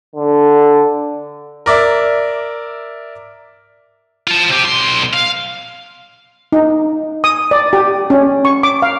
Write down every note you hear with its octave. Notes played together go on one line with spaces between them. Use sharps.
D3
A#4 D5 E5
F4 A5
C3 G4
B1 C6
F5
D#4
D#6
D5
G4
C#4
C#6
D6
F5